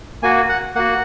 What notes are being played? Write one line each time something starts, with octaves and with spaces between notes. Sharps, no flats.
A#3 F#4 G#5
F#5
A#3 F#4 F#5